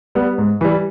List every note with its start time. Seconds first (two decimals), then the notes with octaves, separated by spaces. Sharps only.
0.15 G3 B3
0.38 G#2
0.61 E3 G3